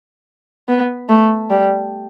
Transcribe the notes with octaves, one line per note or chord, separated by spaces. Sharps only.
B3
A3
G3